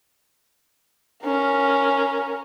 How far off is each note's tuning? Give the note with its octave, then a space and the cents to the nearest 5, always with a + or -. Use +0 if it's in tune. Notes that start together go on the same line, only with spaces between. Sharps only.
C#4 +0 A#4 +0